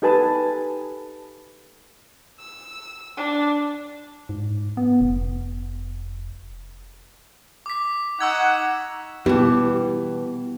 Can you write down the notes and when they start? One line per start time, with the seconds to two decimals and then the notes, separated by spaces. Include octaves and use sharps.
0.02 D#4 G4 A4 B4 G#5 A5
2.40 E6
3.17 D4
4.29 G#2
4.77 B3
5.01 F1
7.66 D6 B6
8.21 D#4 F#5 C#6 E6 G#6
9.26 B2 E3 B3 G4